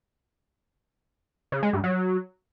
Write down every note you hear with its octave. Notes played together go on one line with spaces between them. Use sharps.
C#3
G#3
G2
F#3